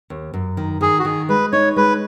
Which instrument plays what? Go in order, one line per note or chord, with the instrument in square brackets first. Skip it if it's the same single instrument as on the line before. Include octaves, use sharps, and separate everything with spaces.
[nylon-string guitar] D#2
F#2
D#3
[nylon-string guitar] D#3 [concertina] G#4
[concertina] F#4
[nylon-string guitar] D#3 [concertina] G#4
[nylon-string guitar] G#3 [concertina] B4
[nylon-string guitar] D#4 [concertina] C#5
[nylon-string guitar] G#3 [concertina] B4